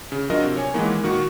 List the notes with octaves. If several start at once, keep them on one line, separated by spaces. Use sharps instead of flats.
C#3
F#3 D4 F4 F#4 A#4 D#5
C3
C#5 G#5
D#3 E3 G#3 A#3 B3
A#2 D#3 F#4 C#6